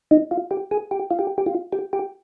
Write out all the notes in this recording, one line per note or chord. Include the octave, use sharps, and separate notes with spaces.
D#4
F4
G4
G#4
G4
F4
G4
G4
F4
G4
G4